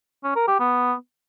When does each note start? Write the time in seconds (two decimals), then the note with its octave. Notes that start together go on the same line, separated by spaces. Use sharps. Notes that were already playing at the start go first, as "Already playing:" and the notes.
0.24 C#4
0.36 A#4
0.48 G4
0.59 B3